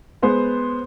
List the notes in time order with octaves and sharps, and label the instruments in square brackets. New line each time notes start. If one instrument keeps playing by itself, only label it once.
[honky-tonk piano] G#3 B3 C5